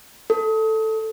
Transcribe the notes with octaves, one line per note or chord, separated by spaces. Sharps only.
A4